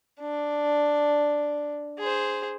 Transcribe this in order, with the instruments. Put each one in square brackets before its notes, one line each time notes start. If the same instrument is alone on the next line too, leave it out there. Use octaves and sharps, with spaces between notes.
[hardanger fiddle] D4
G#4 C5